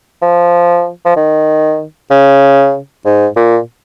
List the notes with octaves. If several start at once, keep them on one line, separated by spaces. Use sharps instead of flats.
F3
F3
D#3
C#3
G#2
A#2